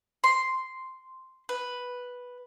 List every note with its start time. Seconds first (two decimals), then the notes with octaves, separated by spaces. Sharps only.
0.24 C6
1.49 B4